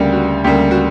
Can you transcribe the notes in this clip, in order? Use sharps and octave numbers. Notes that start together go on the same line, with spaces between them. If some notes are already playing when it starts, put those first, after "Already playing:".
Already playing: D2 C#3 G3 A#3
F#4
D2 C#3 G3 A#3 G4
F#4